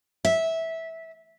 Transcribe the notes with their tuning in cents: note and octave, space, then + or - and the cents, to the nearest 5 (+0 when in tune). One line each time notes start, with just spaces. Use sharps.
E5 -15